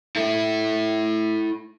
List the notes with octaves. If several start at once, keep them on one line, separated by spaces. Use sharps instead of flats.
E4 A4